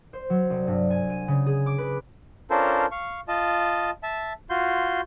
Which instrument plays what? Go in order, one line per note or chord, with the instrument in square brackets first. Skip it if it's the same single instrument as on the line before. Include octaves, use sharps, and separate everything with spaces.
[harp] C5
F#3
C2
G2
G#5
D#7
C#3
G#4
D6
B4
[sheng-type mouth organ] C#4 D4 F4 A4 A#4 C5
F5 C#6
F4 D#5 A5
E5 A5
F4 F#4 C6 G6